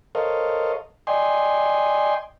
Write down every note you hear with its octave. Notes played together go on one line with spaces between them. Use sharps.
A4 A#4 C5 C#5 D#5 F5
D5 D#5 G5 G#5 C6